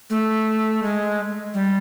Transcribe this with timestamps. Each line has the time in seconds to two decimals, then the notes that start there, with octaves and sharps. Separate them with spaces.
0.10 A3
0.83 G#3
1.54 G3